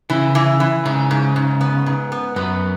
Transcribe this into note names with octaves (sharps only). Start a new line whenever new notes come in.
C#3 E3
E3
E3
G#2 C#3
G#2
G#2
B3
G#2
B3
F#2 B3